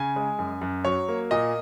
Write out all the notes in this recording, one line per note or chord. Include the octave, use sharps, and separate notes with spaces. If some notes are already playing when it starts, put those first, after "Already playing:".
Already playing: C#3 G#5
G#3
F#2
F#2
F#3 C#5
A#3
A#2 D#5